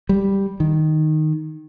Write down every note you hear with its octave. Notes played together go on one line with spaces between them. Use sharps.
G3
D#3